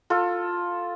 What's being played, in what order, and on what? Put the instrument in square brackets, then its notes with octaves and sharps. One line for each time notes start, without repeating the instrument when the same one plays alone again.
[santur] F4 A4